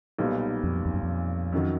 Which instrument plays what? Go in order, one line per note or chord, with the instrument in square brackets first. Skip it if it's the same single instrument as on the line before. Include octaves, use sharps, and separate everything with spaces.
[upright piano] B1 A#2 G3 B3 D#4
[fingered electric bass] F2
F2
F#2
F2
[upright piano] F#2 D#3 F#3